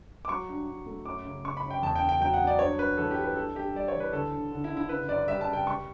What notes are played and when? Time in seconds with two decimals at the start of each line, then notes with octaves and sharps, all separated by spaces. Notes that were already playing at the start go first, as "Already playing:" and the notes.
0.25 D6
0.29 F#3 C#6
0.49 G2
0.67 G2
0.86 A3
1.06 F#2 D6
1.25 C#3
1.44 C#3 C#6
1.57 B5
1.64 F#2
1.71 G5
1.82 E2 A5
1.96 G5
2.02 C#3
2.09 G5
2.21 F#3 G5
2.34 F#5
2.40 F#3
2.47 D5
2.59 G2 C#5
2.79 G2 B4
2.97 E3 A4
3.11 G4
3.17 G2
3.24 B4
3.36 G2 A4
3.55 G2 G4
3.75 G3 D5
3.88 C#5
3.94 E3
4.00 B4
4.13 D2 A4
4.32 D3
4.52 D3
4.64 E4
4.70 D3
4.77 E4
4.89 C#3 B4
5.09 F#2 D5
5.28 G3 E5
5.41 A5
5.47 C#3
5.53 G5
5.66 G3 C#6